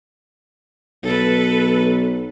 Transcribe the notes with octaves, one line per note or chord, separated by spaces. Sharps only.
B1 A4 B4